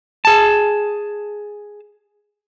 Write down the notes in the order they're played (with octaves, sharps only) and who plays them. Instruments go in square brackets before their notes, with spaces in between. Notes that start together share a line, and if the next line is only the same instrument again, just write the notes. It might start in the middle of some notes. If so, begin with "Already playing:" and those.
[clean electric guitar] G#4 A5